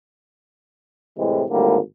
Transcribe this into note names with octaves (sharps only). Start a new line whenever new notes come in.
A2 C3 E3 G#3
G#1 A2 D3 G3 A#3